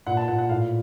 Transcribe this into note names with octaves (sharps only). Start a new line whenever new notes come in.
A#2 F#5
A5
A#2 F#5
F#5
A2 F5